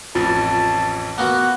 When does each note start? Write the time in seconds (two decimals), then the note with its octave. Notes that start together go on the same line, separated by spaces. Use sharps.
0.15 A1 F2 F4 A5 A6
1.18 A#3 B3 F#4 F#5